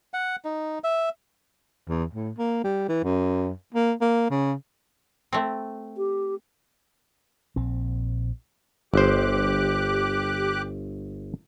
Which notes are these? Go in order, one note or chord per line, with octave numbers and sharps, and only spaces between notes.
F#5
D#4
E5
E2
A2
A#3
G3
E3
F#2
A#3
A#3
C#3
A3 C4
G4
A#1 C4
G1 G4 C5 D6 F#6